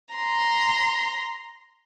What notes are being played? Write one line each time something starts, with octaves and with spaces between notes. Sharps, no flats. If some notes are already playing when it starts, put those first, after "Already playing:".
A#5 C6